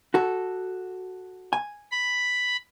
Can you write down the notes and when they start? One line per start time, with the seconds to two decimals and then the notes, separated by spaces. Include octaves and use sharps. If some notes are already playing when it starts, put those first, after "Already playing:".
0.14 F#4 A4
1.53 G#5
1.91 B5